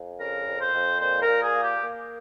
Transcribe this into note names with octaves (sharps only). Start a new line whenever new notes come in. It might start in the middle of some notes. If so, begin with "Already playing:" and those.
Already playing: F2
C#3 A#4
F2
C5
F2
A#2 C5
A#4
A#2
G#4
A#3
G4
A#3